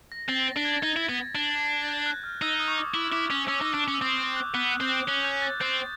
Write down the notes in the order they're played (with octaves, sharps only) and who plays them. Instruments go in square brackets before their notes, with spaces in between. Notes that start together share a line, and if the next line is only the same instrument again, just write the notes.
[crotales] A#6
[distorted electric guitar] C4 [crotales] A6
[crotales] A#6
[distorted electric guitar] D4
[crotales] G#6
A6
[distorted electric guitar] D#4 [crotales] G#6
[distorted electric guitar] E4
B3
D4
[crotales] G6
F#6
F6
[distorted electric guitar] D#4 [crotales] E6
[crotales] D#6
C#6
D6
[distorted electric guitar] E4 [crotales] D6
[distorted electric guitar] E4 [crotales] D6
[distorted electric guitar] C#4 [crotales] D#6
[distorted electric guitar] C#4 [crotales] E6
[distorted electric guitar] D#4
[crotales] E6
[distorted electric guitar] D4
[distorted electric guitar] C#4 [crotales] D6
[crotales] E6
[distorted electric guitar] C4 [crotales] D#6
[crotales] G6
F#6
[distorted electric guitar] B3 [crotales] F#6
[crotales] F#6
[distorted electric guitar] C4 [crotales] G6
[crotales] F#6
[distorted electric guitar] C#4 [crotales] F#6
[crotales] G6
A6
[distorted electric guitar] C4 [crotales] G6